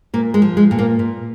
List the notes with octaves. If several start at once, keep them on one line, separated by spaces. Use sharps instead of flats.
A#2 A#3
G#3
F3
G#3
A#2
A#3
A#2